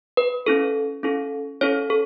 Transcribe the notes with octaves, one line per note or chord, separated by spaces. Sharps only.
B4
C#4 E4 A4
C#4 E4 A4
C#4 E4 A4 C#5
A4